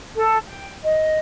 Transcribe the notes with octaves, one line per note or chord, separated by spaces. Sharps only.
A4
G5
D#5